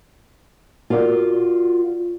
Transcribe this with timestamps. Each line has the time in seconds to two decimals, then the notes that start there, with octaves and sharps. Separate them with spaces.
0.90 F4 F#4 A#4 D5